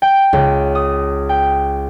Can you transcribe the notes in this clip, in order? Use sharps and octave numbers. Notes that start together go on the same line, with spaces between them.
G5
C#2
D#6
G5